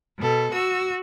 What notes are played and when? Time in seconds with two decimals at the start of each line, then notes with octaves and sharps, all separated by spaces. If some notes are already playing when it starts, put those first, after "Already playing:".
0.17 B2 A4
0.51 F#4 E6